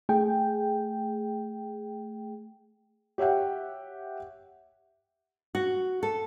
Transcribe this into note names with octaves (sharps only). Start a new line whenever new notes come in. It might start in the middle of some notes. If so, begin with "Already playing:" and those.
A3 G#4 G5
G4 C#5 E5 F#5 G5
F#4
A4